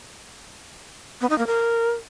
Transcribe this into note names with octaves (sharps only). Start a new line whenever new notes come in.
B3
D#4
A#3
A#4